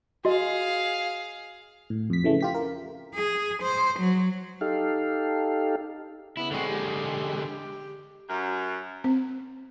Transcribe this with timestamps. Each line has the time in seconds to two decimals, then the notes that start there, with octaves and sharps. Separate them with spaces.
0.25 F#4 G#4 D#5 F5
1.90 A2
2.10 F2 B6
2.24 C#3 E3 A3
2.41 F4 G4 B6
2.54 A#4
3.15 G#4
3.63 C5
4.00 F#3
4.61 D#4 G4 A4 F5
6.37 C#3 B3 E4
6.51 D3 G#3 C4 F#4
6.67 G4
7.35 G4
8.30 F#2
9.04 C4